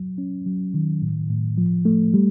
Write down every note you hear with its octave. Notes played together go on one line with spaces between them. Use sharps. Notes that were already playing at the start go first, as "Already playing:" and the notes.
Already playing: F#3
C#4
F#3
D#3
A2
A2
F3
A3
G3